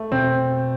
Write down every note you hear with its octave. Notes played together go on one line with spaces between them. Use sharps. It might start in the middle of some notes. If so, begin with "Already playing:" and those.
Already playing: A3
B2 C4